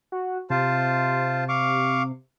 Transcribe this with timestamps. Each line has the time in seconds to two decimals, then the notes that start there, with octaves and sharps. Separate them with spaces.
0.12 F#4
0.50 C3 F4 C5 A5
1.49 F5 C#6 D6